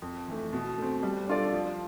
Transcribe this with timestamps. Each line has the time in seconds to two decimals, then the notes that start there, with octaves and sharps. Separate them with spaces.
0.02 F2
0.28 E3 A3
0.53 B2
0.78 A3 C4
1.03 G3
1.27 D4 F4 A4 D5
1.54 F3